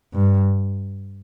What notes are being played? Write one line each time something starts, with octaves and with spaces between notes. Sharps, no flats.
G2